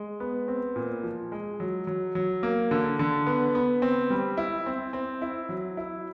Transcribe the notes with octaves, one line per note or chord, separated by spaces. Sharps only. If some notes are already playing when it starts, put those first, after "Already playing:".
Already playing: G#3
B3
C4
A#2
F3
G#3
F#3
F#3
F#3
A#3
D3
D3
B3
B3
C4
G3
E4
C4
C4
E4
F#3
E4